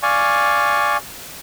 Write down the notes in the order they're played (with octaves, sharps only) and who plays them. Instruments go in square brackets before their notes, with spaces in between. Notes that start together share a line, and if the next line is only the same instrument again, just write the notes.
[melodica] D5 F5 G#5 C#6